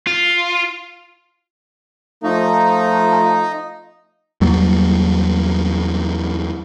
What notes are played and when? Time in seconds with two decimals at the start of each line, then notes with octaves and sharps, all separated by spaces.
0.07 F4
2.24 F3 A3 D#4 F4
4.41 E2 F#3 G3 A#3